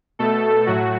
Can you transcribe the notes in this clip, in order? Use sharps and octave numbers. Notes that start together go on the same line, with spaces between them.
B2 A3 A4
A2 F#3 A3 F#4